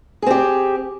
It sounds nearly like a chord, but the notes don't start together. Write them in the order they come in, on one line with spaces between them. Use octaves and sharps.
G#4 C4 G4